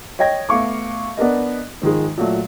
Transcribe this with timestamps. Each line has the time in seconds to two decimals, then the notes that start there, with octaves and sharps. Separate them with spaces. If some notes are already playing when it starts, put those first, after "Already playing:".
0.19 C#5 D#5 G5 G#6 A#6
0.49 A3 B3 F5 C#6 D6
1.17 B3 D4 A#4 D#5
1.82 G#2 D#3 F3 G#3
2.17 A#2 F#3 A3